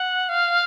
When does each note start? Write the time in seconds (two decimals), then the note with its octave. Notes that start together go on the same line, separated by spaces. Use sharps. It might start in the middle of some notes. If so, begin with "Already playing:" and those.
Already playing: F#5
0.29 F5